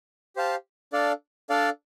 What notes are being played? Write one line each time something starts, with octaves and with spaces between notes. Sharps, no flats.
G4 C5 F5 A5
D4 A4 D5 F5
D4 A4 D5 F5